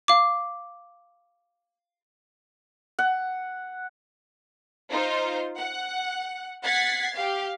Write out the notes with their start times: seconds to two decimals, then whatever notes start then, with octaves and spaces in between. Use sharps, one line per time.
0.08 F5 D6
2.99 F#5
4.91 D#4 F4 C5
5.57 F#5
6.65 F#5 G#6 A6 B6 C7
7.15 G4 F5